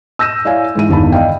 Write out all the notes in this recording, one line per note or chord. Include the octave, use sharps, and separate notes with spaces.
E6 G6 A#6 D#7 E7
E4 C#5 D5 F5 G#5
G#2 E3 D#7
G1 E2 D#3 A5 B5
D5 D#5 F5 G5